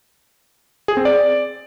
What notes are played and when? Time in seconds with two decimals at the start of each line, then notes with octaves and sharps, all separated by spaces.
0.88 G#4
0.97 C4
1.05 D5